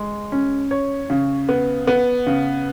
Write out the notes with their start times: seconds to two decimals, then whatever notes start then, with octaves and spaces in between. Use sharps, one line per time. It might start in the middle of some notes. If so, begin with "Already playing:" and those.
Already playing: G#3
0.32 C#4
0.71 C#5
1.10 C#3
1.49 B3
1.87 B3
2.27 C#3